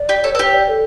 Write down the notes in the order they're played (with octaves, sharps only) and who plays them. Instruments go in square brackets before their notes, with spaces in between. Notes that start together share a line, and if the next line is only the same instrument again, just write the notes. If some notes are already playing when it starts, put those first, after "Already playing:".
Already playing: [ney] D5
[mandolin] G4
[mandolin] A4 [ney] C#5
[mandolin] A4 [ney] B4
[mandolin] G4 [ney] C#5
[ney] D5
A4